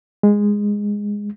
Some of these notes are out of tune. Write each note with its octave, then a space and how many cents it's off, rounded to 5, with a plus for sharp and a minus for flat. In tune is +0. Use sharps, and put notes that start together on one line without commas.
G#3 -10